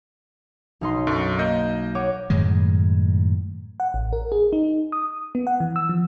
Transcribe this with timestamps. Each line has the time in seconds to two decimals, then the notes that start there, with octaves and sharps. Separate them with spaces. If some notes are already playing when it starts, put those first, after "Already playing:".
0.81 B1 D#4 C6
1.07 F#2 D3 C#6
1.39 A#3 D#5 G6
1.95 C#5 F#5 D6
2.30 F#2 A2 D#3 G#3
3.80 F#5
3.94 A1
4.13 A#4
4.32 G#4
4.53 D#4
4.92 D#6
5.35 B3
5.47 F#5
5.60 E3
5.76 E6
5.89 F3